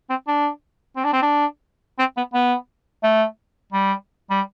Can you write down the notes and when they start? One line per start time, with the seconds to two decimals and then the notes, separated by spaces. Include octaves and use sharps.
0.10 C4
0.28 D4
0.96 C4
1.04 D4
1.13 C4
1.22 D4
1.99 C4
2.17 B3
2.34 B3
3.03 A3
3.72 G3
4.30 G3